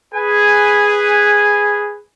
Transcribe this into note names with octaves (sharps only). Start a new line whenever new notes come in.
G#4 B4 G#5